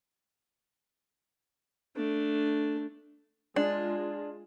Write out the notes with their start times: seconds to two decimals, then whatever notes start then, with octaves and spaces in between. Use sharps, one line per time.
1.96 A3 D4
3.56 G#3 D4 F4